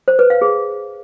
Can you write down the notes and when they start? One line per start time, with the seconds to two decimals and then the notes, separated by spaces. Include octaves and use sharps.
0.08 C5
0.19 B4
0.30 F5
0.42 G#4